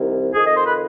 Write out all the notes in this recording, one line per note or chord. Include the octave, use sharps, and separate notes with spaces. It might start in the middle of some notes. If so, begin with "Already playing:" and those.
Already playing: C2 C3 D#3
F2 D#3 G#4
D#5
C5
B4